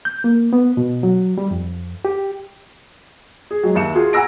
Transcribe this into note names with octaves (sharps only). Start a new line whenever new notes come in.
G6
A#3
B3
B2
F#3
G3
F2
G4
G#4
F#3 G#3
D#2 E5 C#7 E7
F4 F#4 G#4
F#5 G#5 A#5 E6 A#6 D7